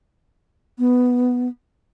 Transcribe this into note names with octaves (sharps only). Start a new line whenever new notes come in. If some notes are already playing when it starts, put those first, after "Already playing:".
B3